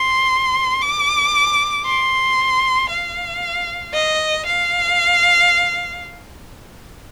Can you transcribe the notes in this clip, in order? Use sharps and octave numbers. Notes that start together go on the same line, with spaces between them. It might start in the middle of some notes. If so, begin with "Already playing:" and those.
Already playing: C6
D6
C6
F5
D#5
F5